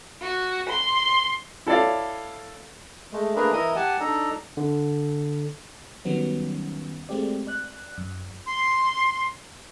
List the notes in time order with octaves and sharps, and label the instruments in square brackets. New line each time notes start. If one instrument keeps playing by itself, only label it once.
[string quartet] F#4
C6
[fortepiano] E4 A4 C#5 D5 F5
[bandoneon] G#3 A3
A3 A#3 D4 G#4 A#4 B4
E3 E4 A#4 D#5 D#6
G4 F#5 G#5 A5
D4 D#4 A4 A#5
[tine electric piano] D3
[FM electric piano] D#3 F#3 G3 B3 C#4
G#3 A3 C4 G4 D5
D5 F#6
F#2
[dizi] C6